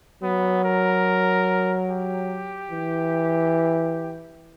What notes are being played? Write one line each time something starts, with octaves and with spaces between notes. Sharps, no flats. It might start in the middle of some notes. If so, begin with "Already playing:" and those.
F#3 B3
A#4
G4
E3